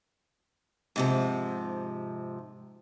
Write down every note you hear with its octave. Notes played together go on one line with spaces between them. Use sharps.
G#2 C3 F3